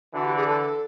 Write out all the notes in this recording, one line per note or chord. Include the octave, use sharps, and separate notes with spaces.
D3 E3 F#4
G4
G#4
A4